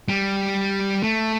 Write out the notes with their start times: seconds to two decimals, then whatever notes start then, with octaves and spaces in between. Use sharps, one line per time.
0.09 G3
1.03 A3